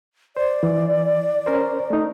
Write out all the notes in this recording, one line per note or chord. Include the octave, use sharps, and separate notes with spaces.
C5 D5
E3
C#4 A#4 C5
A3 D#4